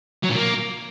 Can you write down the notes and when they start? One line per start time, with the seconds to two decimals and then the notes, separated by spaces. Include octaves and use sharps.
0.23 F#3
0.29 A#2
0.35 A#3